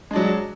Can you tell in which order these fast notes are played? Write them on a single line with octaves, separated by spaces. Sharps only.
G#3 D4 F#3